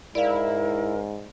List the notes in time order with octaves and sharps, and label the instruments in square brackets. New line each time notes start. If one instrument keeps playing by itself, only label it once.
[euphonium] G#2 [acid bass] E4 [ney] A#4 [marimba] D5 F5